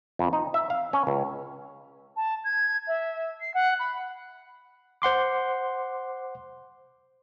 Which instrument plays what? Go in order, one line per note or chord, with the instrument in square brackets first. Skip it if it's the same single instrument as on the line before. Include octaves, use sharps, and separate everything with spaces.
[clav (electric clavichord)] F2
D#4
E5
F5
C#4
C#2
[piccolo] A5
G#6
E5
C7
F#5
B5
[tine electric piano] C5 F#5 C6 D6